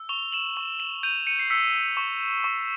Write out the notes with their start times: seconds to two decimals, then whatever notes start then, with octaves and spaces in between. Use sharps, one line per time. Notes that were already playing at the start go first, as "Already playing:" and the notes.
Already playing: E6
0.09 C#6 F7 G7
0.33 E7 F#7
0.57 C#6
0.80 E7 F#7
1.03 G6 D#7 F7
1.27 C#7 D#7
1.39 C7
1.50 E6 B6 C#7
1.97 C#6
2.44 C#6